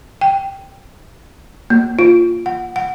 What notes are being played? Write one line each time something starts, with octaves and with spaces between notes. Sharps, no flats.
G5
A#3
F4
F#5
F#5